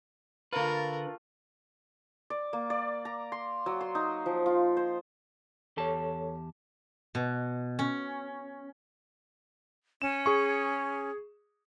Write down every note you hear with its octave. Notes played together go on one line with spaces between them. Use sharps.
D3 A3 F4 A#4 B4
D5
A#3
D5
A#5
C6
F#3
C6
D#4
F3
F4
C5
E2 G4 A4 C#5 A5
B2
C#4
C#4 E7
G#4 C#6